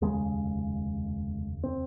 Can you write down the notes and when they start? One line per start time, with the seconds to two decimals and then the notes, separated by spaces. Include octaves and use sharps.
0.01 F1 D#2 C#3 G#3
1.64 C4